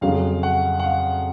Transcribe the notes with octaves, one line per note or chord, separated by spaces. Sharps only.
F2 C#3 F#3 F5
F#5
F#5
F5